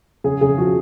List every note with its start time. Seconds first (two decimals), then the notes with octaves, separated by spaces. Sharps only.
0.24 C#3 G#4
0.41 C#3 G#4
0.57 F3 F#4